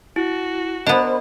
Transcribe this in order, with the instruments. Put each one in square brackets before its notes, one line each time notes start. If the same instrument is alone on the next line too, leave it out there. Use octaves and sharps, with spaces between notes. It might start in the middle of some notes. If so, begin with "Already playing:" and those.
[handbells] E4 [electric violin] F#4
[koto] B3 D4 [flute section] A#4 C5 B5 [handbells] D#5